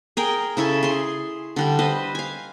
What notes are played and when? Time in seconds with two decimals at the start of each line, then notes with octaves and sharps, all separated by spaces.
0.17 G#4 A#4 G5
0.57 C#3 E4 A4 G#5
0.83 G#4 C6
1.56 D3 G3 D5
1.79 B4 C5 D#5
2.15 F5 G#5